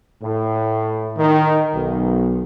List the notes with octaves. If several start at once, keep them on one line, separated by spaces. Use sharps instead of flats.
A2
D#3
B1